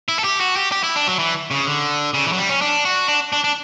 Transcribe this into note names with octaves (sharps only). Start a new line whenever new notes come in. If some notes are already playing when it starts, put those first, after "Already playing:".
E4
A4
G4
F#4
G4
G4
E4
D4
F#3
E3
C#3
D3
C#3
E3
F#3
G3
C#4
D4
F#4
D4
D4
D4